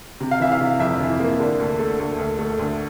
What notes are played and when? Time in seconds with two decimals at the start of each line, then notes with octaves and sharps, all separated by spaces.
0.21 C3
0.31 F5
0.40 E3 E5
0.52 F5
0.60 C3
0.80 F2 E5
0.99 E3
1.20 A#3
1.40 D3
1.60 D2
1.79 A3
1.99 D2
2.18 D2
2.39 A3
2.59 D2